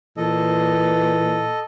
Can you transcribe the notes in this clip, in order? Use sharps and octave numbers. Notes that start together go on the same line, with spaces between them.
A#2 E3 A4 D#5